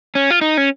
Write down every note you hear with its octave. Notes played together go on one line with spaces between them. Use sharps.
C#4
F4
D#4
C#4